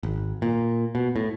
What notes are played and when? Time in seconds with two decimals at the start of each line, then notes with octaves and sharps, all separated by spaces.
0.03 G#1
0.42 A#2
0.95 B2
1.16 A2